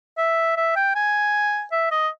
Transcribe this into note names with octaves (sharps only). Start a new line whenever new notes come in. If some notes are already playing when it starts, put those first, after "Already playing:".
E5
E5
G5
G#5
E5
D#5